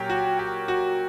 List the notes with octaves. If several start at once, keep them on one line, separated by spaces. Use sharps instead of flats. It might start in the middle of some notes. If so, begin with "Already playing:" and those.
Already playing: A#2 F#3 A#3 C#4 G4 C#5
F#4
G4
F#4